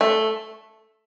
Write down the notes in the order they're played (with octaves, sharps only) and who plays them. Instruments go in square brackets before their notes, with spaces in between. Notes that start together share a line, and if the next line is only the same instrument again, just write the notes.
[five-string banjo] A3